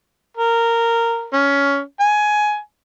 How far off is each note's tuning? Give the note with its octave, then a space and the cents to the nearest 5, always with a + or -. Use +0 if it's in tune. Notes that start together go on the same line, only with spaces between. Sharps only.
A#4 -10
C#4 +15
G#5 +15